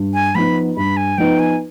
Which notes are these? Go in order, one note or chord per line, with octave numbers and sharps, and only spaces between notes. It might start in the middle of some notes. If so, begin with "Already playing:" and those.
Already playing: G2
G#5
F3 B3 D#4 B4 B5
G2 B5
G#5
F3 B3 D#4 B4 G5
G#5